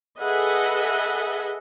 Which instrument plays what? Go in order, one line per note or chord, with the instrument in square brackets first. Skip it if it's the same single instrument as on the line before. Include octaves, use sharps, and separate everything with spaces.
[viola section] G#4 A4 B4 D#5 E5 F#5